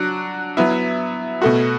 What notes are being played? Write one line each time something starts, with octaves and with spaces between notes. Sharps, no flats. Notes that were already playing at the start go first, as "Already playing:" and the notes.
Already playing: F#3 D4 F#4
F#3 B3 E4
B2 A3 F#4